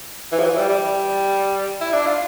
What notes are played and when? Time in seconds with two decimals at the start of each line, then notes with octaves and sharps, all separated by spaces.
0.32 E3
0.39 F3
0.44 E3
0.57 G3
0.69 G3
1.81 E4
1.93 D4
2.06 F4